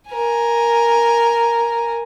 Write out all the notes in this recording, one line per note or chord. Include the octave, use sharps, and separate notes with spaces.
A#4 G#5